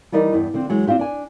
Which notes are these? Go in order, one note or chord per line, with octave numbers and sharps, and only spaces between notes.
E3 G3 D#4 A#4 D5
E2 G2
D3 F3 C4
E3 F#3 G#3
C4 D4 F4 G4
D4 G#5